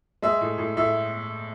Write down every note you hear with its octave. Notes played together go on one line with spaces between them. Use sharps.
G#3 E5
A2
A2
A2 E5